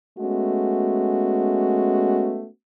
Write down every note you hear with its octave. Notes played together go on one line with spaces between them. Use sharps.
G#3 A3 B3 C#4 F#4